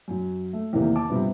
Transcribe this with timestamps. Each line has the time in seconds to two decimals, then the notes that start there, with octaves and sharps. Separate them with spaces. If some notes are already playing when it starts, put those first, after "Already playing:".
0.08 F#2 F#3
0.53 A3
0.73 E2 A2 C3 D#3 E3 A#3
0.96 A5 D6
1.09 G2 C3 F3 G3 B3 D4